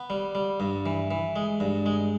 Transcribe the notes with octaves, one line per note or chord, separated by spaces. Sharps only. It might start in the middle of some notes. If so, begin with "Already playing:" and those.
Already playing: B3
G3
G3
G2
E3
E3
G#3
G2
G#3